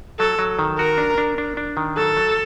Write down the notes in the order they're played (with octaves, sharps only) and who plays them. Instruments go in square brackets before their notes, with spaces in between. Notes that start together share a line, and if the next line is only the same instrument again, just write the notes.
[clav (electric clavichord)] F#3 [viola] A4
[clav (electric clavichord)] F#3
D#3
[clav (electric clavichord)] F#4 [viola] A#4
[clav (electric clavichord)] D4
D4
D4
D4
D#3
[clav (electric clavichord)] F#3 [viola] A4
[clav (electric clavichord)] F#3